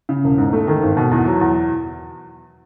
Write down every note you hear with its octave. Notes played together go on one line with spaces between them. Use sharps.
C#3
E1
G#2
A3
D#3
G#1
B2
E2
F#3
E2